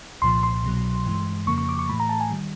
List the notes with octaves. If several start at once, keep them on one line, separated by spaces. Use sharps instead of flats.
C2 A#2 F3 C6
C6
C2 B2 F#3
G2 E3 G#3
F2 C#3 F3 A#3 C#6
C#6
D6
C#6
A2 E3 A3 B5
A#5
A5
G#5
D#3 G3